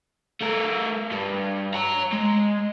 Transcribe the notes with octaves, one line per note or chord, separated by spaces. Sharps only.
A3 A#4
G2
C#5 A#5
G#3